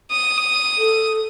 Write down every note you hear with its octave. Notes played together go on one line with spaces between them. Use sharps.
D#6
A4